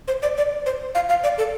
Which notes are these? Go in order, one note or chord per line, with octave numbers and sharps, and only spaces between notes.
C5
D5
D5
C5
F5
F5
D5
A4